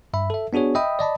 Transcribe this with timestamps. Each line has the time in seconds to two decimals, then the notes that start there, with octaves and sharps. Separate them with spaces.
0.13 G2 E5 B5
0.30 A4 E5
0.53 B3 D4 F#4 G#4 C#5
0.75 D#5 E5 G5 B5 D#6
0.99 D5 D#5 A5 B5